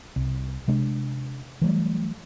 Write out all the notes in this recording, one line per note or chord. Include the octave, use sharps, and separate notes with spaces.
C2
C3 G#3 D4
E3 F#3 G3 A3